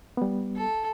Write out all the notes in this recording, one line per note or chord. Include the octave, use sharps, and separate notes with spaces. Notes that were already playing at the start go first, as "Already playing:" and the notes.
G3 B3
A4